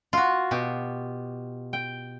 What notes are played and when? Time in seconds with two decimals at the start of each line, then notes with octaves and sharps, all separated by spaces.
0.13 F4 F#4
0.51 B2 G4
1.73 G5